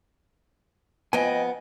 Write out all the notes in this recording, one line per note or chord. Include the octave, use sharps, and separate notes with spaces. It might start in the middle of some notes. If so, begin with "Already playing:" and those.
F2 B3 D#5 G5 G#5